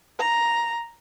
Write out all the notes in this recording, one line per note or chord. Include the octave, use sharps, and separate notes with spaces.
A#5